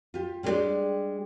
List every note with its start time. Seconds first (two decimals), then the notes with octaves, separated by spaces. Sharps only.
0.14 F4 G4
0.43 G3 G#3 D4 E4 G4 D5